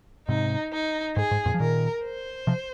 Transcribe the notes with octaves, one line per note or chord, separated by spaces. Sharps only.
G#2 C3 D#4
D#4
G#2 G#4
G#2
F2 A#2
F3
A#2 D#3 A#4
C5
C3 F3